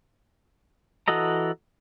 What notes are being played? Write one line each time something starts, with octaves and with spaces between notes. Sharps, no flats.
E3 F#4 A4 D#5 A#5